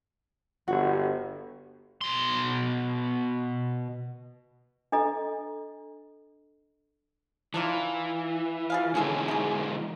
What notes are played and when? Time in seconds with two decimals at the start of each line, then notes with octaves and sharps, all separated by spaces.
0.68 G1 F#4
2.01 B2 C6
4.92 D4 A4 D#5 A#5
7.54 E3 D4 D#4 F4
8.70 F4 G#4 F5
8.95 D3 E3 G#3 C#4 G#4 A4
9.28 D#4 G#4